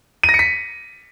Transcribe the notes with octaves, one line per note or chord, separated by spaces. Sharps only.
D#7
A#6
C#7
B6